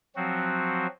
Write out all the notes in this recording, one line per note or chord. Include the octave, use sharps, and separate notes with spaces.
F3 F#3 C4 F#4